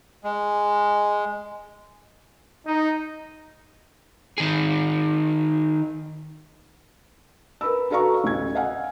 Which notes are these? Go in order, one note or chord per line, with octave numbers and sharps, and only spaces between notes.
G#3
D#4
D#3 G#4
A#4 B4 B5 E6
F#4 A4 B4 F5 A#5 C#6
A1 D2 G#6
D#5 F5 F#5 G#5